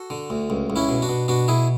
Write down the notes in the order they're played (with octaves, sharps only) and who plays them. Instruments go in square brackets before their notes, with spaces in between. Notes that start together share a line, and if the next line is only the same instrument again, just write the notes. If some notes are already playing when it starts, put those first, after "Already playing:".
Already playing: [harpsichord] F#4 A4
D3
D2
C#2
C#2
C#4 E4
B2
D4 F#4
B2
B2 D4 F#4
B2 E4 G#4